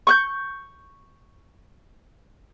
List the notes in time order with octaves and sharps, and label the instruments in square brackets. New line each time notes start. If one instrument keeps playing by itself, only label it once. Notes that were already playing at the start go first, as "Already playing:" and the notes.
[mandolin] C#6 F#6 G6